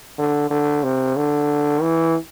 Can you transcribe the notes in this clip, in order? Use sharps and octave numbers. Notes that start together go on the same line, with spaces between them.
D3
D3
C3
D3
E3